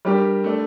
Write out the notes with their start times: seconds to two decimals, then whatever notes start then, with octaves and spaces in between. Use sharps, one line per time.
0.05 G3 D4 G4 A#4
0.44 A3 D4 A4